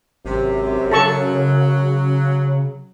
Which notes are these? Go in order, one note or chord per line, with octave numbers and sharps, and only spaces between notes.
G#1 F#2 C3
C#3 F#3 A4 A5 C#6